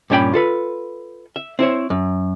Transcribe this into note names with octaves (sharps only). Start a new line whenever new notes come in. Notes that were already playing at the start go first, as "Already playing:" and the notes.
G2 A#2 C#4 D4 G5 B5
F4 A4 B4
E5
C4 E4 C5 C#5
F#2